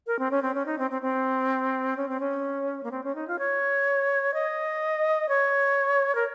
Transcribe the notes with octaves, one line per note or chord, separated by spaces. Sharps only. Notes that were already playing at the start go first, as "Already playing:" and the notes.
A#4
C4
C#4
C4
C#4
D#4
C4
C4
C4
C#4
C4
C#4
A#3
C4
C#4
D#4
F4
C#5
D#5
C#5
A#4